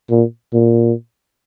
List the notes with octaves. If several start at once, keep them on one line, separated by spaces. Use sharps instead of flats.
A#2
A#2